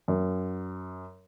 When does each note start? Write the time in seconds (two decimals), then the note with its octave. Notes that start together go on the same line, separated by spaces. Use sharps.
0.08 F#2